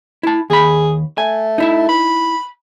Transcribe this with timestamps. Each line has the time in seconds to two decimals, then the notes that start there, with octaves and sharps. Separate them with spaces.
0.23 E4 A5
0.50 D#2 G#4 B5
1.18 A3 G#5
1.58 D#4 E4 E5
1.88 B5